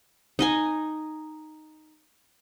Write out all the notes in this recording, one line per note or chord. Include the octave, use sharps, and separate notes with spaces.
D#4 D#5 G#5